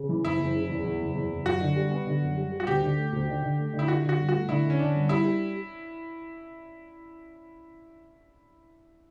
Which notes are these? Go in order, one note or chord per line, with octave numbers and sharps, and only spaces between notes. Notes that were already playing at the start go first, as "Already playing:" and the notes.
Already playing: C#3
E3
F#1 E4
F#1
C#3
E2
E2
F#1
E2
F#1
F#2 F#4
D3
G3
B3
D3
F#2
G3
G3
F#4
D2 G4
D3
A3
D2
D3
D3
A3
D3
E4
D3 F#4
D3
F#4
G1
F#4
A3
D3 E4
D3
C#4
D3 D4
G1
G3 E4
G3